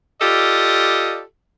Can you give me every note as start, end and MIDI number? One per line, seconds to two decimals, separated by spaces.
0.22 1.22 65
0.22 1.22 67
0.22 1.22 69
0.22 1.22 74
0.22 1.22 75